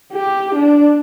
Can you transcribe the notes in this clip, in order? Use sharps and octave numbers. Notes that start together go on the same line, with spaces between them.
G4
D4